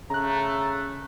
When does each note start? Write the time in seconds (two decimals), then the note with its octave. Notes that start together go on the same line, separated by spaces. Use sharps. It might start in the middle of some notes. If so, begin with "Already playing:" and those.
0.10 C#3 A3 A#5 F#6